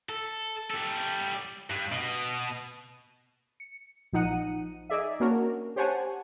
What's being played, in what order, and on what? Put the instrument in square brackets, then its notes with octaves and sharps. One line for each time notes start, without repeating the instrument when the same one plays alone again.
[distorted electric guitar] A4
G3 A4
G2
B2
[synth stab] C#7
A#1 F3 D#4 F#5 C#7 D#7
D#4 G#4 D5 E5
A#3 C#4 D4 F#4 A#4
G4 C5 C#5 F#5 G#5 A5